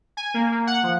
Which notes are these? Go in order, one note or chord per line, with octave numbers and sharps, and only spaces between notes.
G#5
A#3
A#3
F#5
F3